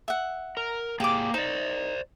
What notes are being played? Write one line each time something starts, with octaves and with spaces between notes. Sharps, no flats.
E5 F#5
A#4
A#3 G4 G#4 D6
D#4 C5 D5